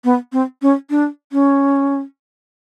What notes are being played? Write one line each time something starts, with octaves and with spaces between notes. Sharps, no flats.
B3
C4
C#4
D4
C#4